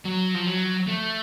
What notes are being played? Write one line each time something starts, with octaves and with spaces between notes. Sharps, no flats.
F#3
F3
F#3
A3